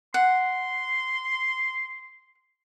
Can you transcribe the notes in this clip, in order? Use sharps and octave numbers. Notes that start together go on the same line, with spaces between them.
F#5 C6